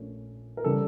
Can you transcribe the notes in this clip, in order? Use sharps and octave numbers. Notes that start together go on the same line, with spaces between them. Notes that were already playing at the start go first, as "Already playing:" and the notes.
Already playing: A#1 A#2 A3 C#4
A#4
C#3 E3 G3 A4